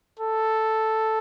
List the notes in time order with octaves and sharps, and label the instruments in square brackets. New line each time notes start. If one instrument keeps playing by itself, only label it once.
[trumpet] A4